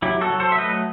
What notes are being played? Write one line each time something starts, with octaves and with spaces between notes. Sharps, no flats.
F#3 E4 G4
F#4 A4
F#3
A4 C5
E5
A3 B4 D#5